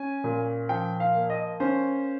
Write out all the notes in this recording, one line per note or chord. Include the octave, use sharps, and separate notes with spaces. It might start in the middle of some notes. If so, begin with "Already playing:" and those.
Already playing: C#4 G#5
A#2
F3 G5
F5
A#3
D#5
C#4 C5